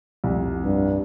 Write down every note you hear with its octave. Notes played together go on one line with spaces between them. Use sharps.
C2 F2
G2